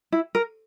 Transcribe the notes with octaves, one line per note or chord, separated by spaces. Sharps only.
E4
A#4